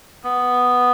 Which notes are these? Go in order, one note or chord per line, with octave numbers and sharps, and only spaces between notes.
B3